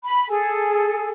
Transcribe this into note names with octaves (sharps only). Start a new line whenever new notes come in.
B5
G#4 A4 G#5